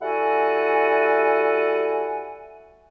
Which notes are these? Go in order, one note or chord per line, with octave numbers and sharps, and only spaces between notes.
G3 E4 F#4 A4 F#5 G#5